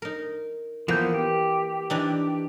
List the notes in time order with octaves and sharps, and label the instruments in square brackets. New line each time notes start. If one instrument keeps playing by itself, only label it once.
[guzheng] D#4 A#4
[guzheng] E3 A#3 [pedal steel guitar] F3 B3 G6
[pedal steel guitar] G4
[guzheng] E3 D4 D#4